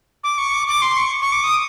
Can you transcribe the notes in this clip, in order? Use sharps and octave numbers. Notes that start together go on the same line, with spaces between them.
D6
C#6
D6
D6
C6
C#6
C#6
D6
D#6